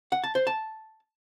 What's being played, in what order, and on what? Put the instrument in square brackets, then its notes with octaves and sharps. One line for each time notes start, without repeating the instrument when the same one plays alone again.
[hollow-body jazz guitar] F#5
A5
C5
A5